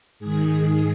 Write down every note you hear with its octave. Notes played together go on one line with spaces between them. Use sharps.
G#2 D#3 G#4